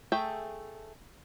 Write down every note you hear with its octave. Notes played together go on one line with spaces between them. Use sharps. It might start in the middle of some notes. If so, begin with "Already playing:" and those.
A3 G#4 A4 E5 G5